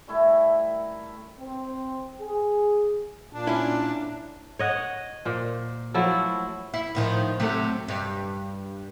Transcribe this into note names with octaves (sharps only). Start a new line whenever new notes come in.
G3 A3 E4 A#4
C4
G#4
A#2 D4
C#4 E4
C#5 D#5 F#5
A#2 C5
F3 F#3 A3 E4
E4
A2 D#3 F3
C3 F#3 A3
G2